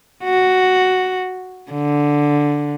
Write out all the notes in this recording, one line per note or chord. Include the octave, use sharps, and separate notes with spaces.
F#4
D3